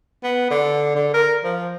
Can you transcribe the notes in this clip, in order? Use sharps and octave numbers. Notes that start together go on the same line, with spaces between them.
B3
D3
D3
A#4
F3